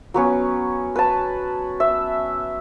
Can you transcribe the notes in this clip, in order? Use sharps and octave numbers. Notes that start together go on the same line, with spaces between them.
F#3 B3 C#4
B4 A5
E5